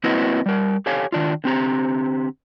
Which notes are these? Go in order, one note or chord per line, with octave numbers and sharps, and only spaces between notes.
A#3 C4 E4 F#4 B4 D#5
G3 A#4
G4 A4 C#5 F5 G#5
D#3 D4 F4
D3 C4 G4 A#5